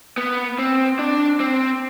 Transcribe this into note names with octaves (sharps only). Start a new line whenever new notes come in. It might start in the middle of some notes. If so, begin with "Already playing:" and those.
B3
C4
D4
C4